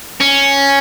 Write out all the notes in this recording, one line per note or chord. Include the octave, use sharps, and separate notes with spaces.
C#4